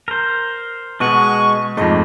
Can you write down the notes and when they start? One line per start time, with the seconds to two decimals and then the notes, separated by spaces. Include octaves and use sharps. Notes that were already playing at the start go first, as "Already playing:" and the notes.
0.08 A#4 C5
1.00 B2 G#3 D#5 F#5 C#6
1.77 F2 G#2 A3 D#5